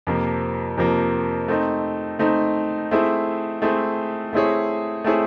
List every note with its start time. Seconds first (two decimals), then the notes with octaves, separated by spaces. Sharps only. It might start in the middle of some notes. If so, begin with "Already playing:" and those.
0.07 F2 C3 F3 A#3
0.77 F2 C3 F3 A#3
1.48 A3 C4 D#4
2.19 A3 C4 D#4
2.91 A3 C4 E4 G#4
3.62 A3 C4 E4 G#4
4.33 A3 C4 E4 G#4 C#5
5.04 A3 C4 E4 G#4 C#5